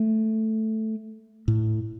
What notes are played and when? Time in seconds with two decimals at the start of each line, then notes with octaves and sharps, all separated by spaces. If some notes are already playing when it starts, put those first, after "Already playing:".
Already playing: A3
1.48 A2